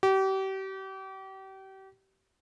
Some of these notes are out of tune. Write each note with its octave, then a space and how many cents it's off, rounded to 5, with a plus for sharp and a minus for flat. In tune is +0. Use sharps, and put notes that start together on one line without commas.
G4 -35